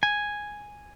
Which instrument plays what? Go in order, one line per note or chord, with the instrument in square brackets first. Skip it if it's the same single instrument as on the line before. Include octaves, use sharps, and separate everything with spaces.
[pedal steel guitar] G#5